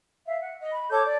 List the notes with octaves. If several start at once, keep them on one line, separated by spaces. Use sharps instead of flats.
E5 F5
F#5
D#5
B5
A4 C#5 D6 G6
D5